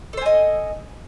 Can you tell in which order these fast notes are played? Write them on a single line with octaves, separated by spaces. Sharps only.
A4 C5 G#5 D#5